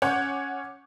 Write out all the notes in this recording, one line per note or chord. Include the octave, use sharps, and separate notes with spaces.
C#4 C#5 F#5 D6 G6